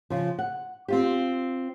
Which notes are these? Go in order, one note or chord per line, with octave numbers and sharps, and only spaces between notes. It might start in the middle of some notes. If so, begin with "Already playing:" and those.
C#3 F3
F#5
C4 F4 G4